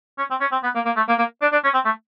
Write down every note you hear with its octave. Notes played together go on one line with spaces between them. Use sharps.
C#4
C4
C#4
C4
B3
A#3
A#3
A3
A#3
A#3
D4
D4
C#4
C4
A3